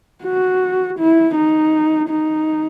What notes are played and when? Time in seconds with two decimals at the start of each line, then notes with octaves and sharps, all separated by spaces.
0.24 F#4
0.98 E4
1.35 D#4
2.09 D#4